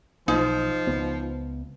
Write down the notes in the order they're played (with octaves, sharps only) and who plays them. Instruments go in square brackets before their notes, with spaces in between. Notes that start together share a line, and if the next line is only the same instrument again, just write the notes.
[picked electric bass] B1 [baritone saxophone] F3 [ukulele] D#4
[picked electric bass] C#2 B3